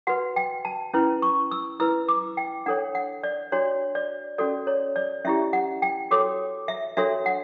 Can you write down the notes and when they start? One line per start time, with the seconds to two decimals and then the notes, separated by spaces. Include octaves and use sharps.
0.07 F#4 B4 F#5
0.36 G5
0.65 A5
0.94 C#4 E4 B4
1.22 C#6
1.51 E6
1.80 E4 B4 E6
2.08 D6
2.37 G5
2.66 D4 A4 C#5 F#5
2.95 F#5
3.23 D5
3.52 D4 F#4 C#5
3.95 D5
4.38 C#4 F#4 A4 D5
4.67 C#5
4.96 D5
5.25 C#4 E4 G4 E5
5.53 F#5
5.82 G5
6.11 F#4 A4 C#5 D6
6.68 E5
6.97 D4 F#4 A4 C#5 E5
7.26 F#5